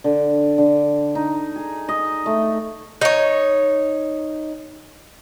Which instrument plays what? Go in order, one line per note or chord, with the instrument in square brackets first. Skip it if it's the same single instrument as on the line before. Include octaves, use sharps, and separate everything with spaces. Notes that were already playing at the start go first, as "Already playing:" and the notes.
[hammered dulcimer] D3
D3
D#4
G#4
D#5
A3
[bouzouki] D#4 C#5